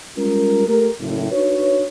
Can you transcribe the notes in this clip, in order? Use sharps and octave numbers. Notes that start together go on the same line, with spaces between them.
G3 G#3 C#4 F4 A#4
A3 G4 A#4
F#1 A2
D4 D#4 F#4 B4 C#5